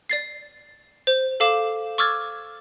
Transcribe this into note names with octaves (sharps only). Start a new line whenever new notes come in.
D5 A6 C7
C5
A4 F5 D6 E7
C#6 D6 E6 F6 G#6 A6